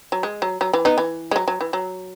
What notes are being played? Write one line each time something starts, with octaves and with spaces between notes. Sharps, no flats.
F#3
G#3
F#3
F#3
E3
B3 D#4
E3
G#3
F#3
F#3
E3
F#3